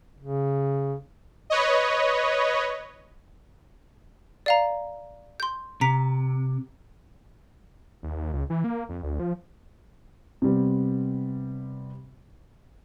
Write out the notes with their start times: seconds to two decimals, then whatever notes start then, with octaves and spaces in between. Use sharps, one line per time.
0.20 C#3
1.50 B4 C#5 D#5
4.46 D5 F5 A#5
5.40 C6 G6
5.81 C3 A#5 B6
8.03 D#2
8.16 D#2
8.33 C#2
8.50 E3
8.64 A#3
8.89 F2
9.03 D2
9.20 F3
10.42 C3 G3 B3